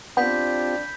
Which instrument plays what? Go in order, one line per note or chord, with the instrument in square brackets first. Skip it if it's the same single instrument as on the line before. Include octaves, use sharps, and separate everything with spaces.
[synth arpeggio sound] B3 [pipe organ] C4 F4 G4 [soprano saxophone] D4 [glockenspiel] B5 G6 B6